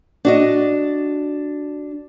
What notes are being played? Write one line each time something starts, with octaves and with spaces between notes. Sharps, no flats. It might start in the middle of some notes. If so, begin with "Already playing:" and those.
D4 F#4 D#5